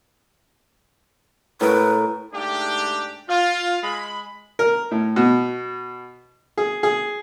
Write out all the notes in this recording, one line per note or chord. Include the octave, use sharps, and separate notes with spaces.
A2 A#4 B4
G#2 A3 D4 G4
F4
G#3 B5
A#4
A2
B2
G#4
G#4